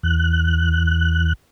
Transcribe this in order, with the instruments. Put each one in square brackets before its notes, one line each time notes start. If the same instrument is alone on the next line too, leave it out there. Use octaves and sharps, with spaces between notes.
[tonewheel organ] E2 F#6